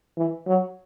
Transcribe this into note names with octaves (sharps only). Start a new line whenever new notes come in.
E3
F#3